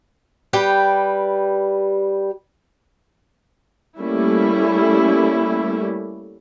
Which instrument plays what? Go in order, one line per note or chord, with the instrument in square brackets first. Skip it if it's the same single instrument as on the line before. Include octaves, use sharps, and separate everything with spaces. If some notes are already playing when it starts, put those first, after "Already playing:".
[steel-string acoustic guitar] G3 G4 B4 G5
[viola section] G3 A3 A#3 C#4 E4